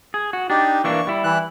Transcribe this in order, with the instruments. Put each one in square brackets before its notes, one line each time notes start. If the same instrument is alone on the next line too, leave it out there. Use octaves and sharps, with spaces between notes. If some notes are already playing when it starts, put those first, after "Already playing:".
[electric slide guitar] G#4
F#4
[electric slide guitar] D4 [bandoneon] D#4 G4
[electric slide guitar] E3 A#3 D4 [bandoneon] C#6
[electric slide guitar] G3 E4
[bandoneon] E3 F#6